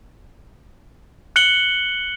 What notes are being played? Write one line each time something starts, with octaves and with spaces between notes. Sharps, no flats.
F#6 C#7 F#7 G7